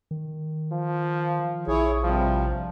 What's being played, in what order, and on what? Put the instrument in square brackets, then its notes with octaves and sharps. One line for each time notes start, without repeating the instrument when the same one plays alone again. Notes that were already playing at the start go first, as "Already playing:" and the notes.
[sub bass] D#3
[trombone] F3
[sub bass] A#1 [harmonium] E4 G#4 C#5
[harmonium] G2 C3 G3 [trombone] F3